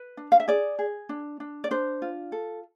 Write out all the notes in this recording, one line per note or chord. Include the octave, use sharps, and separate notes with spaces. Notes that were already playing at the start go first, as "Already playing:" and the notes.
Already playing: B4
D4
F5
E5
G#4 D5
G#4
D4
D4
D5
D4 C5
F4
A4